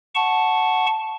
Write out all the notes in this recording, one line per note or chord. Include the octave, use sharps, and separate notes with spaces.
F#5 A5 C#6